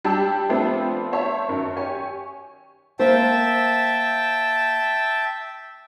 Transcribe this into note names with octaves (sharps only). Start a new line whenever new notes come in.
G3 D4 G4 G5 A5 E6
F3 A3 B3 C4 D4 F4
C5 C#5 E5 A5
F#2 D#3
G4 C#5 G#5 C#6
A#3 A#4 C5 E5 G5 A5